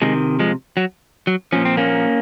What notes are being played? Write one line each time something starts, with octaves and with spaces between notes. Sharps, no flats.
C3 D#3 F3 G#3
F3 G#3
F#3
F#3
A#2 F3 C#4
C4
A#3 C#4